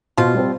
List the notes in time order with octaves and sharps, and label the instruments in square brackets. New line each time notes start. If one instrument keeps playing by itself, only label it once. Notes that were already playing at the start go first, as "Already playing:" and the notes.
[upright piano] B2 [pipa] F3 F4
[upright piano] G3 C4